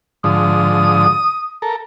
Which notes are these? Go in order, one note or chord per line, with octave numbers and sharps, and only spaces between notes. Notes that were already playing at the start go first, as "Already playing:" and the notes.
G#2 D3 F3 D#6
A4 A#4